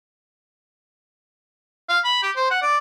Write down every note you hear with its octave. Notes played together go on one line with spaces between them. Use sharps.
F5
B5
G4
C5
F#5
D5